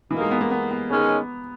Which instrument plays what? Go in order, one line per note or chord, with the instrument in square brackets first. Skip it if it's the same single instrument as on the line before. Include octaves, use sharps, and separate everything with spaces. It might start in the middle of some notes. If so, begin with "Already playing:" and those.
[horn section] B2 A#3 D#4 [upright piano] E3
[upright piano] G#3
B3
A#3
B3
B3
[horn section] D#3 G#3 C#4 G#4 C#5 [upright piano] B3